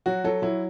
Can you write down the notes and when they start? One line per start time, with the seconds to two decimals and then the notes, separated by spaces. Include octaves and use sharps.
0.06 F#3 F#4
0.24 F#3 A4
0.42 F#3 E4